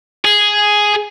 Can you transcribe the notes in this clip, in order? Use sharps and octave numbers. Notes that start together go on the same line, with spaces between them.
G#4